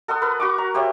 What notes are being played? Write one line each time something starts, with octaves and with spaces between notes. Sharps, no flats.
A4 F#5 C6 D#6
A#4 B4 C6
F#4 C#6 D6
A#5
G4 C5 C#5 E5